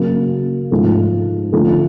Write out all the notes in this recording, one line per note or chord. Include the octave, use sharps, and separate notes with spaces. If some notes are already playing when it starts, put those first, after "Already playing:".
Already playing: C#3 F#3 A#3
G#2 F3 A3
D3 F3 A3